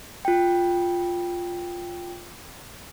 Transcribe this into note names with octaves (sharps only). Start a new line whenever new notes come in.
F4 G5